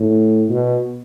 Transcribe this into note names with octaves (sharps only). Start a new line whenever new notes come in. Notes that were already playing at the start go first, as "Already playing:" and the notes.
Already playing: A2
B2